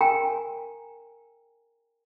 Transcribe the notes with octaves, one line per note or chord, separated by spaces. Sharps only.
A#4 G5 G#5 A#5